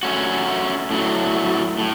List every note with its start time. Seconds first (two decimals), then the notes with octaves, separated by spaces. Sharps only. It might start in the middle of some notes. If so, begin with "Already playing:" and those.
0.03 A3 C#4 F#4
0.91 A2 F#3 A3
1.78 A2